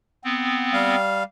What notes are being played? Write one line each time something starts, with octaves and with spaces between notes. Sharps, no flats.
B3 C4
G3 F5